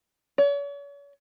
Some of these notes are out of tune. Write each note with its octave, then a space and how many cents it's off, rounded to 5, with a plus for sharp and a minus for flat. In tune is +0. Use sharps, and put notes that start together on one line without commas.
C#5 +40